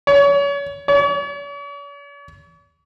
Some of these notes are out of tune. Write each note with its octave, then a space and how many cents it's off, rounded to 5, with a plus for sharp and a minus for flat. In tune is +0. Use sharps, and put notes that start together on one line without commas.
C#5 +35
C#5 +45